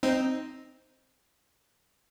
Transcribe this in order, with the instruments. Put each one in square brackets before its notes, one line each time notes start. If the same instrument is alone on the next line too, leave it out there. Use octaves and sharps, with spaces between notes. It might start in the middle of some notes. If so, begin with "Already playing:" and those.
[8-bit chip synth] C4 D#4